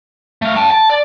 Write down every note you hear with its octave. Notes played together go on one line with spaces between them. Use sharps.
A3 F5
G5 A5
A5
D5